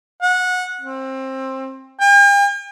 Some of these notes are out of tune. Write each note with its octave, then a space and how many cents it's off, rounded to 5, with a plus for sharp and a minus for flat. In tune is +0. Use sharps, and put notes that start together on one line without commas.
F#5 -20
C4 +20
G5 +45